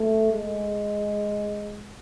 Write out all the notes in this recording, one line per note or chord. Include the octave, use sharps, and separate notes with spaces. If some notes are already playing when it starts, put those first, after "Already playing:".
Already playing: A3
G#3